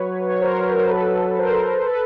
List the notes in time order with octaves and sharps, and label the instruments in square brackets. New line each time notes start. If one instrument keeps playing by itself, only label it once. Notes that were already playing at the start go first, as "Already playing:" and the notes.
Already playing: [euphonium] F#3 [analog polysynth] B4 C#5
[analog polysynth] C#5
A#4 C5
C5
A4 B4
A#4 C5
A4 B4